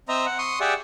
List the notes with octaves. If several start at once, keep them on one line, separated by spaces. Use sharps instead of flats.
C4 C5 D#5 E5 A#5
F#5
C6 C#6 D#6
G4 G#4 D5 E5 F#5